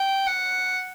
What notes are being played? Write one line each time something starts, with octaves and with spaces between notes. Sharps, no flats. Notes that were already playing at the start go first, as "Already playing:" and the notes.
Already playing: G5
F#5